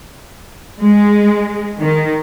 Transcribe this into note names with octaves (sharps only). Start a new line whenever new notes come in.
G#3
D#3